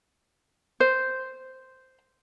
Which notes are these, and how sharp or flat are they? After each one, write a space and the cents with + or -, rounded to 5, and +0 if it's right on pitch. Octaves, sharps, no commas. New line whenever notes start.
C5 -5